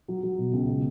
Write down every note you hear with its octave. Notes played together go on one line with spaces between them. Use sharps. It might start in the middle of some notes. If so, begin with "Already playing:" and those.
F#3
F#3
B2
C#2
B2